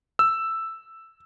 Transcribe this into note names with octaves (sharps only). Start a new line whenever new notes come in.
E6